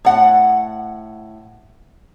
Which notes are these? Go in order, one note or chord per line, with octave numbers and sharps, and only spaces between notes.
A2 F#5